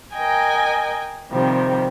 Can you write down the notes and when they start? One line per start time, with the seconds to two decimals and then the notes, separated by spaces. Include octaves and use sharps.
0.14 A#4 D#5 G5 G#5
1.31 C3 D#3 F3 G3